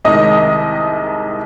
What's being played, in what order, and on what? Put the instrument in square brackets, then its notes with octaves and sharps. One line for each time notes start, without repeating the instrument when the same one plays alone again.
[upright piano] C2 C3 D#3 G#3 D#5